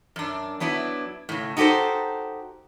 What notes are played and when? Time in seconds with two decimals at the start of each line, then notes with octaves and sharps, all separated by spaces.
0.16 F#2 D4
0.60 F#3 B3 D4 E4
1.29 A2 C#3
1.57 D#4 F#4 G4 A4 C5